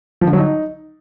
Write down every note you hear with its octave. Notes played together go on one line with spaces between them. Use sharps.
F3
D3
F#3
D#4